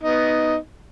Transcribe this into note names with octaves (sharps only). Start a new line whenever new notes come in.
B3 D#4